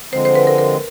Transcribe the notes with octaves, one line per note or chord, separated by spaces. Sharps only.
D3 F3 G#3 C4 C5
C5
B4
A#4
A#4